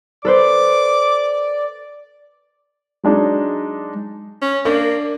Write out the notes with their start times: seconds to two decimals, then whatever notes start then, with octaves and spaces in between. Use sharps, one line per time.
0.25 A4 B4 C5 D5 D6
3.03 F#3 G#3 D4 D#4
4.42 C#4
4.65 A#3 D4